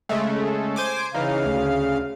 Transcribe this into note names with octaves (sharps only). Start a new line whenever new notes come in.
C#3 G#3 A3
C5 G#5 D6
C#3 E3 D#4 F5
D2